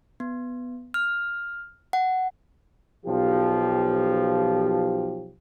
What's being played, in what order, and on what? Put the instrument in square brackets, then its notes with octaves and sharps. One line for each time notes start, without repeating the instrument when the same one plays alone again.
[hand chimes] B3
F6
F#5
[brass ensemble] B1 F3 G4